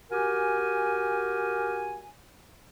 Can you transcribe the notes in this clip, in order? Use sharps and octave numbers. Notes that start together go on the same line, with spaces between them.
F#4 G4 A#4 G#5